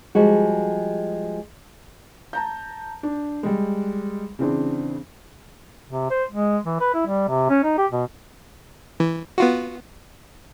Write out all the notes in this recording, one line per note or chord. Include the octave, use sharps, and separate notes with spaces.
F3 G3 G#3 F#4
A5 A#5 G6
D4
G3 G#3
C#3 E3 C4 D4
C3
C5
G#3
E3
B4
E4
G3
C3
C#4
D#4
G4
B2
E3
B3 F4 F#4